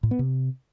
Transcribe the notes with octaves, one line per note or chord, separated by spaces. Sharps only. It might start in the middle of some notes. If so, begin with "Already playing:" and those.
A2
B3
C3